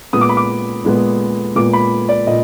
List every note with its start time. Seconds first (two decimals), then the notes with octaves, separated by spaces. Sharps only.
0.13 A#2 G#3 B3 D#6
0.21 D6
0.29 B5
0.37 D6
0.85 A#2 G#3 B3
1.56 A#2 G#3 B3 D6
1.73 B5
2.09 D5
2.27 A#2 D#5